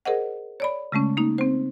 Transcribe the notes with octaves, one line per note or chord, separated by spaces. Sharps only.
G#4 A#4 C5 D#5 F#5
C#5 D5 B5
C#3 G#3 A3 C#4
A#3 D#4
C4 C5